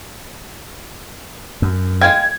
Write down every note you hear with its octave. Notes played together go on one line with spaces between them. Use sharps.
F#2
G#3 F5 G5 G#6